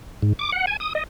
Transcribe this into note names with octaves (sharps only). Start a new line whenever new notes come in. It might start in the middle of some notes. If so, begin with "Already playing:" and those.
G#2
D6
F#5
G#5
D#6
D#5